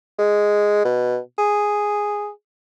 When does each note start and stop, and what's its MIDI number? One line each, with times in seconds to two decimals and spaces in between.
0.19 0.82 56
0.85 1.18 47
1.38 2.29 68